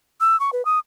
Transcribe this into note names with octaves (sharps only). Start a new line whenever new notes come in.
E6
C#6
B4
D#6